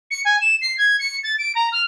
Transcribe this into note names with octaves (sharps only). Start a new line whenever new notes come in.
C#7
G#5
E7
C7
G#6
C#7
A6
D7
A#5
F6